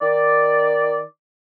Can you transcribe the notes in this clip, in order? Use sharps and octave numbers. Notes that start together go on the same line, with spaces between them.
D#3 D5